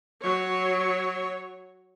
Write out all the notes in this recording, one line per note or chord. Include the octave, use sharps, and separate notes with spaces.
F#3 C#5